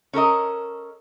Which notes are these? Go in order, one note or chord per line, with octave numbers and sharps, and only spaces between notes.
C#4 A4 A#4 D#5